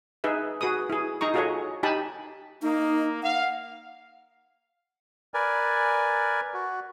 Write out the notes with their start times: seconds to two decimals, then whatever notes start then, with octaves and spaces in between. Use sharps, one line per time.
0.24 D#4 G#4 B4 E5
0.61 F#4 G#4 B4 D#6
0.90 E4 G#4
1.21 D#4 G#4 A#5 C#6
1.34 F4 F#4 G#4 A4 C#5 D#5
1.83 D#4 G4 G#5 A5 B5
2.62 A#3 D#4
3.22 F5 F#5
5.34 A#4 B4 D5 G#5
6.54 F#4